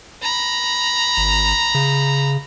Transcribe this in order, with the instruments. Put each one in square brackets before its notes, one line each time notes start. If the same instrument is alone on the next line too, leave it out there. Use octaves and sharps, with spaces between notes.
[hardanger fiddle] A#5 B5
[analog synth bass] G#1
C#3